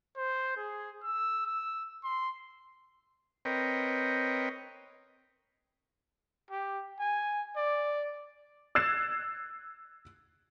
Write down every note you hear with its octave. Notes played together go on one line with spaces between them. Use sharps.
C5
G#4
E6
E6
C6
C4 A#4 B4 C#5 D#5 G5
G4
G#5
D5
E6 F#6 G#6 A6 C7 E7